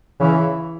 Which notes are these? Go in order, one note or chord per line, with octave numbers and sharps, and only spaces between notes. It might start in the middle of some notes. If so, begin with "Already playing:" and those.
C#3 E3